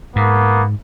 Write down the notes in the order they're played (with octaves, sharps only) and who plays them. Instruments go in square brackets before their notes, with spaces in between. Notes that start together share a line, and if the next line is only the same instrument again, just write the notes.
[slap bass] G#2 [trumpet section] A#3 B3